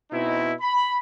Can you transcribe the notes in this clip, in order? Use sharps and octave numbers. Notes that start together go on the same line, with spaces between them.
B2 C4 D#4 E4
B5